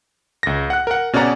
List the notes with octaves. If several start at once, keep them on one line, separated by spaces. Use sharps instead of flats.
C#2 A#6
F#5 F#6
A#4 F#5
B2 C#4 G#4 D5 F#5 A#5